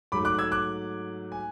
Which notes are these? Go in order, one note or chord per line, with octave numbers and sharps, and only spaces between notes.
G#2 F#3 A3 B5 D6
D6 F#6
E6 G#6
D6 F#6
G#5